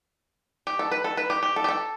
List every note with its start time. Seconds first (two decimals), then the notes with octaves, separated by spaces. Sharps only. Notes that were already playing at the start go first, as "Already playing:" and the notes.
0.67 G4
0.79 A4
0.91 B4
1.04 A4
1.17 B4
1.30 G4
1.43 G4
1.56 A4
1.64 G4
1.69 A4